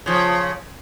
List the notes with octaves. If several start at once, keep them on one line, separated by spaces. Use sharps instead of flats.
C#3 F3